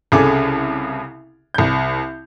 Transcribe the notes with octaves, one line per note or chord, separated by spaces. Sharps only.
C2 C#3 G#4 A4 D6
C2 G6